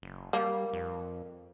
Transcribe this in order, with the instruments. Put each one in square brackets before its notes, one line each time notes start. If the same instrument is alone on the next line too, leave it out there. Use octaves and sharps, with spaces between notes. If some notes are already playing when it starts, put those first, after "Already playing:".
[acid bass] F#1
[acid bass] G3 [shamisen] A#3
[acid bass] F2